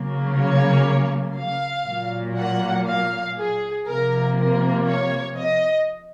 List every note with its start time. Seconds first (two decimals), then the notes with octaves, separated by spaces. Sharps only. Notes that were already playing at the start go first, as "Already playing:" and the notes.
Already playing: C#3 F#3 A#3
0.37 C#5
1.36 F5
1.86 A#2 F#3 A#3
2.37 F#5
2.87 F5
3.37 G#4
3.87 C3 F3 A#3 A#4
4.38 A#4
4.88 C#5
5.37 D#5